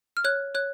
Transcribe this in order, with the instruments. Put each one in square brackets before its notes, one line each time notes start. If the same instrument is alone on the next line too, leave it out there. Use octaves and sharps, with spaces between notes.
[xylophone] F6
C#5 F#6
C#5 F#6